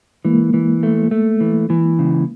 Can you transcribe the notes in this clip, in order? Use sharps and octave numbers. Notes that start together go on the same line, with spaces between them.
E3 G#3 A#3
E3
A3
A3
E3
E3
C#3